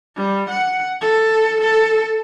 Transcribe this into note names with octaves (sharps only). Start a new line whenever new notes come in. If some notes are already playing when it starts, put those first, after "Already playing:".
G3
F#5
A4
A4